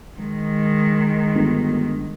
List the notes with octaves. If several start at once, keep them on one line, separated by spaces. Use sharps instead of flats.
D#3 G#3
G1